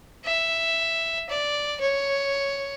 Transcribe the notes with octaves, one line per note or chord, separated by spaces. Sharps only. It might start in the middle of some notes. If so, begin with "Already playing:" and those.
E5
D5
C#5